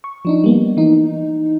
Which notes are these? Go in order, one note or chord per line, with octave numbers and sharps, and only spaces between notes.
C#6
F3 D4 D#4
G3 A#3 B3
E3 D#4